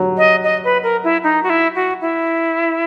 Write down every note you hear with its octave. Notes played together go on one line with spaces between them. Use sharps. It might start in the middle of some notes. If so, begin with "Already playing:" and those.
Already playing: F#3
D#5
D#5
B4
A#4
E4
D#4
F#4
E4
F#4
E4